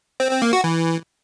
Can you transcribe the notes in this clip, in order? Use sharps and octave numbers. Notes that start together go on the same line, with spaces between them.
C4
C4
A#3
F#4
E3